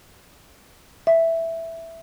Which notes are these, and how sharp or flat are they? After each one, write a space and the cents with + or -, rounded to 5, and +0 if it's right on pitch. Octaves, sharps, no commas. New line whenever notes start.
E5 +0